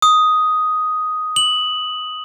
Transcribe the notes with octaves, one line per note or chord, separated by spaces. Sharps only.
D#6
F#7